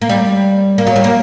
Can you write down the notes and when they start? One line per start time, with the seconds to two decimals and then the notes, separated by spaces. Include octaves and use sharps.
0.02 A#3
0.09 G3
0.78 A#3
0.87 F#3
0.96 G3
1.04 A#3